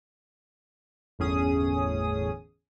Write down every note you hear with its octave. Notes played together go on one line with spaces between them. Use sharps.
G1 E2 A2 C#4 G#4 D#6